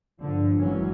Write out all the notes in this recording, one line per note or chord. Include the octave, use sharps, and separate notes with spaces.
G2 D3 F3
G#1 E3 F#3 C#4